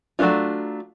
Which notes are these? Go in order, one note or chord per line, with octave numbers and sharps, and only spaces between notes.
F#3 A3 B3 D4 F4